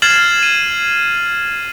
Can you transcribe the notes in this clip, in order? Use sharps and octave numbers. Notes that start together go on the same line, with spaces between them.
F6 G#6 A6 C7 E7 F#7
D#7